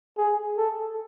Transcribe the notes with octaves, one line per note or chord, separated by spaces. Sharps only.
G#4
A4